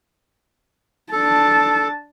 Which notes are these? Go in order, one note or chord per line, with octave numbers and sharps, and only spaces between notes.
D4 A4 A5